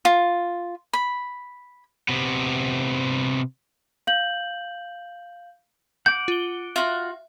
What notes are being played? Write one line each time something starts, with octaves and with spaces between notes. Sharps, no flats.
F4
B5
C3 B3
F5 G6 F#7
F#5 D6 G6
F4 G7
F4 F#4 E5